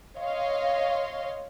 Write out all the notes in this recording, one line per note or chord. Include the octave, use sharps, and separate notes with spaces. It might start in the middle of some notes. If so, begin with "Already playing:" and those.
C#5 D#5 F5 C6